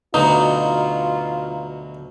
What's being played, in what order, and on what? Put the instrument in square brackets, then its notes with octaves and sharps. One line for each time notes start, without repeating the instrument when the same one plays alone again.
[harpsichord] D2 B2 F#3 [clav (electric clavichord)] D#4 [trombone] F4 [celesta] B4 A#5